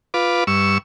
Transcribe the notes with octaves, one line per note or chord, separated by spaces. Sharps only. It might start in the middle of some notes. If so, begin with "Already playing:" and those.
F4 B4 D6
G2 C#6 E6